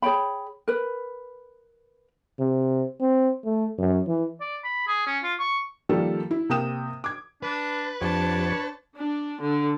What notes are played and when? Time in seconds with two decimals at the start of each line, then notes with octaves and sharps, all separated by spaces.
0.02 G#4 C#5 G5 B5
0.68 A#4 B4
2.39 C3
3.01 C4
3.45 A3
3.79 F#2
4.07 E3
4.40 D5
4.64 B5
4.87 G#4
5.07 C#4
5.23 F4
5.40 C#6
5.89 D#3 F3 G3 A#3 A4
6.31 E4
6.50 C3 A#3 G5 D#6 E7
7.04 D6 G#6
7.43 D4 B4
8.01 F2 F3 D4 G4 C#5 A5
8.96 D4
9.42 D3